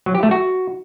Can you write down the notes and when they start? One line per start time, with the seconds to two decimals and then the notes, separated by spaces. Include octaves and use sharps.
0.06 F#3
0.15 G4
0.23 A3
0.31 F#4